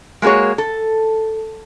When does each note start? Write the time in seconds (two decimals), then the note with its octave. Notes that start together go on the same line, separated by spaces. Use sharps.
0.22 G#3 A#3 F#4 G#4 C#5
0.58 A4